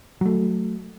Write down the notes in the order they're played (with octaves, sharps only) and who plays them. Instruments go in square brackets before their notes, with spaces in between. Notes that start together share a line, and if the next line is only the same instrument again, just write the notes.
[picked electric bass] F#3 A3